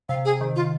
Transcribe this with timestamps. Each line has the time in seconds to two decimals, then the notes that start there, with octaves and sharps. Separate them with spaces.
0.09 C3 F5
0.25 G#4
0.41 D#3
0.56 F4